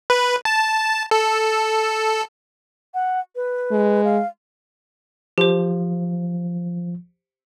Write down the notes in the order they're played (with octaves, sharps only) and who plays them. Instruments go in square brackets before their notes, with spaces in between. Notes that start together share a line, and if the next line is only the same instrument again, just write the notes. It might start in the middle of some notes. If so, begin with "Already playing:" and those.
[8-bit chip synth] B4
A5
A4
[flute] F#5
B4
[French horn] G#3
[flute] F5
[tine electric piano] F3 [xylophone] G4 C5